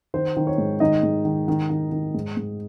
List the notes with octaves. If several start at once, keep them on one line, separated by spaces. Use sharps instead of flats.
D#3 C5
D#3
C#5
G#2
D#3 D#4 D#5
G#2
D#3
D#3
D#3
D#3
G#2
G#2